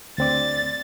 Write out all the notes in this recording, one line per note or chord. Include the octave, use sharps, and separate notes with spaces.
D2 C4 D5 A6